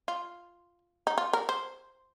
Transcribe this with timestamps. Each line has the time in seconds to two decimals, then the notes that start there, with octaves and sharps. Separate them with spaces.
0.08 F4
1.07 D#4
1.18 F4
1.33 A#4
1.49 C5